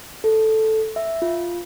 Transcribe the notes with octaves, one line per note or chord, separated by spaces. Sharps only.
A4
E5
F4